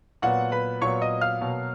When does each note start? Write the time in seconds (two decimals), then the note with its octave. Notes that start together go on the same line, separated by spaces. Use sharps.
0.22 A#2 F#3 B3 F#4 F#5
0.52 B4 B5
0.81 A#2 F#3 B3 C#5 C#6
1.02 D#5 D#6
1.21 F5 F6
1.41 B2 F#3 A#3